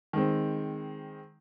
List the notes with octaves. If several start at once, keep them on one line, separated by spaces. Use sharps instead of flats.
D#3 G#3 C4